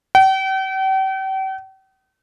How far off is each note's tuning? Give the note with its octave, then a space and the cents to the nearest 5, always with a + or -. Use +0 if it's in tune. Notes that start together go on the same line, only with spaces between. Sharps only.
G5 -40